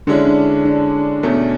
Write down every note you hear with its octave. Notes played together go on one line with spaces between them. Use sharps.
D3 G#3 C#4 D4 E4
D4
D4
E2 B2 A3 C#4